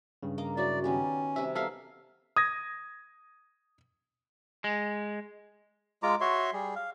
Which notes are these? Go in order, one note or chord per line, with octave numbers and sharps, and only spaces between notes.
G2 C#3
A#3 D#5 D6
F#3 E4 F#4 D5
D#3 B3 C#4 G4
C3 G3 E5
G3 B3 D#4 A4 E5 F5
D#6 G#6 A#6
G#3
G#3 F4 A#5 D6
F#4 C#5 E5 C6
G3 G#4
F5